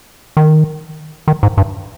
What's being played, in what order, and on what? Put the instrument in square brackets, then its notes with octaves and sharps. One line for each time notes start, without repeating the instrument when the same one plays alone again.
[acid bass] D#3
D#3
G#2
G2